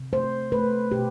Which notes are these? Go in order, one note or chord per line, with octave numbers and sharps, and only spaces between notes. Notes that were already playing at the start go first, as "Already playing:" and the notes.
Already playing: C3
A3 C5
A3 B4
B2 G4